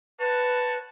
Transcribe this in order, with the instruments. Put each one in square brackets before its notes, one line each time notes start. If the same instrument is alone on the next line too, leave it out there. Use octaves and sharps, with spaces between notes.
[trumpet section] F#4 C#5 A5 [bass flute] B4